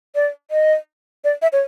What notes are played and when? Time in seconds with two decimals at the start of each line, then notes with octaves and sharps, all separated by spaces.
0.15 D5
0.51 D#5
1.24 D5
1.42 E5
1.53 C#5